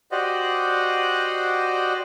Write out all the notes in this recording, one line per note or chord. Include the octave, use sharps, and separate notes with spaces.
F#4 G4 C5 D5 D#5 F#5